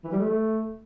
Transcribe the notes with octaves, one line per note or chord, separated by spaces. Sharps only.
E3
G3
A3